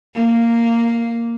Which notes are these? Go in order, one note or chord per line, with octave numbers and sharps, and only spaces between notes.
A#3